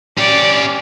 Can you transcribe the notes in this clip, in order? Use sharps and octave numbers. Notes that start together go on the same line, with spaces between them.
C#4 G4 D5